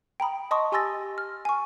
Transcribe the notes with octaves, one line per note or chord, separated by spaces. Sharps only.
G5 A#5 B5 D#6
D#5 A5 C6 C#6 D#6
G4 G#5 C6 E6 A6 A#6
F6
G#5 C#6